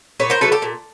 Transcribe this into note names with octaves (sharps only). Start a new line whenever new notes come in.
A#2 B4 C#5
A#4 C5
F#3 A3 A4 B4
G4 A4
A#2